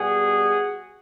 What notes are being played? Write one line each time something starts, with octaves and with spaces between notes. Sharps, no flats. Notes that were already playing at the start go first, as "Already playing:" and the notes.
Already playing: B2 G3 F#4 G#4